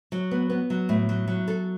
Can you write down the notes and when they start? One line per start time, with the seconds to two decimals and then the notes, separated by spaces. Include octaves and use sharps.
0.12 F#3
0.31 B3
0.50 B3
0.70 F#3
0.89 A2
1.09 F#3
1.28 F#3
1.48 A4